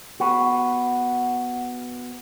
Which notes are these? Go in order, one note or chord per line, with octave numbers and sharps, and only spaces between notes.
B3 F#4